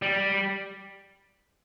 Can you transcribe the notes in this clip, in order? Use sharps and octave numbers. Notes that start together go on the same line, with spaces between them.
G3